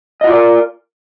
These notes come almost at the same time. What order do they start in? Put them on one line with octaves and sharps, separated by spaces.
D#5 F#4 F4 D5 A#4